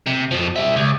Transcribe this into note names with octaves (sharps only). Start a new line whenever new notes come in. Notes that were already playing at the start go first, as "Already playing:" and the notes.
C3
F2 F3
G3 E5
C#2